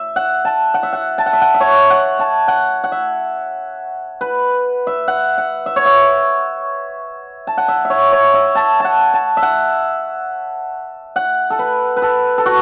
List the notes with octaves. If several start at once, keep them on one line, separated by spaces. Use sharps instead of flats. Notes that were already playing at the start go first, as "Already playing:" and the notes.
Already playing: E5
F#5
A5
F#5
E5
F#5
A5
F#5
E5
F#5
E5
C#5
F#5
A5
F#5
F#5
E5
B4
E5
F#5
F#5
E5
C#5
E5
A5
F#5
E5
E5
C#5
C#5
E5
A5
F#5 A5
A5
E5
F#5
F#5
A4
B4
B4
A4
A4
F#4